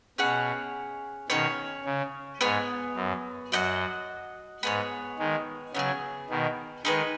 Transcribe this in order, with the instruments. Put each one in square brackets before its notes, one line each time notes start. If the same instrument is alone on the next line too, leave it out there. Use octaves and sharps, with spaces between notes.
[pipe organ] B2 [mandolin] C#4 G#4 C#5 F#5
[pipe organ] B2 D#3 [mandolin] C#4 G#4 C#5
[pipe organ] C#3
[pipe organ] G#2 [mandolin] B3 G#4 C#5 G#5
[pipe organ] F#2
[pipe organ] F#2 [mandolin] F#4 D#5 F#5
[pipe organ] G#2 [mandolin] B3 G#4 C#5
[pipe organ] D#3 G#3
[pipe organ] C#3 F#3 [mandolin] B3 D#4
[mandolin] G#4
[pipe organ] B2 D#3
[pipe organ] D#3 G#3 [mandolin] D#4 G#4 B4